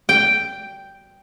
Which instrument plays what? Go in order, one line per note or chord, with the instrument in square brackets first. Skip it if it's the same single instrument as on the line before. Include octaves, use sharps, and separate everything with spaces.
[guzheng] G5